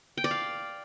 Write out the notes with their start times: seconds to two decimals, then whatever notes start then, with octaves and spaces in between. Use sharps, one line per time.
0.18 G5
0.24 D5
0.31 F5